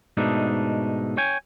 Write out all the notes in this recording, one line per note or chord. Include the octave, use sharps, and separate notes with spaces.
G#2 B2 A3 D4 D#4
C#5 G5 G#5